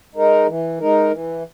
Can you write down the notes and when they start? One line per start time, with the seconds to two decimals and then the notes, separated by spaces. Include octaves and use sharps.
0.15 G#3 D#4 A#4
0.47 E3
0.80 G#3 D#4 A#4
1.11 E3